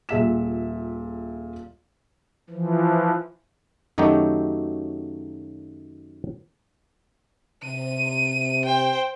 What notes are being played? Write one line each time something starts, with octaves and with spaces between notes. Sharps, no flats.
D#1 A#2 G#4 E5 B6 E7
E3 F3
F#2 D#3 F#3 A3 D#4 G4
C3 D#7
C5 G5